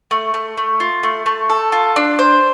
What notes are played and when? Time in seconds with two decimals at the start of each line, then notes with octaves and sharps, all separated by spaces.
0.11 A3
0.34 A3
0.57 A3
0.80 F4
1.03 A3
1.26 A3
1.49 A4
1.72 F4
1.96 D4
2.19 C5